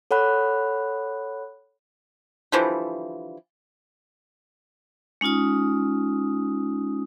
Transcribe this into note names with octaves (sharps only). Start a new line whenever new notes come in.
A4 C#5 F#5 B5 F#6
D3 E3 F3 G3
G#3 C#4 D#4 F4 D#6